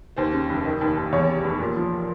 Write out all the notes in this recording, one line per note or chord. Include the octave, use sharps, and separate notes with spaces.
D#2 C5
C#3
F1
D#3
D#2
D#2
E2 C#5
C3
F1
A#2
F3